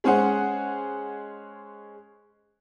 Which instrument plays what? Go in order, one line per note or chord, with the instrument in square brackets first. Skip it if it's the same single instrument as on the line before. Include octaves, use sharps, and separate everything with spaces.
[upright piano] G#3 C#4 G#4 C5 F#5